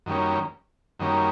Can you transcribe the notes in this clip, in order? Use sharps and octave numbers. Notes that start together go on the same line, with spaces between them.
F#2 D#3 G3 A#3 C#4
F#2 D#3 G3 A#3 C#4